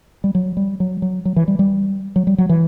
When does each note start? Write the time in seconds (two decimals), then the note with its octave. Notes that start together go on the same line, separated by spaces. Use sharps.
0.24 G3
0.35 F#3
0.57 G3
0.80 F#3
1.02 F#3
1.25 F#3
1.36 E3
1.48 G3
1.59 G3
2.16 F#3
2.27 G3
2.38 F#3
2.49 E3